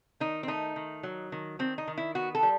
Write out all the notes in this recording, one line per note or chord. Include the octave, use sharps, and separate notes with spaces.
D#3 D#4
C4
A3 D#4
D#3
F#3
D#3
D#3 C4
D#4
D#3
E4
B3 F#4
A4
G3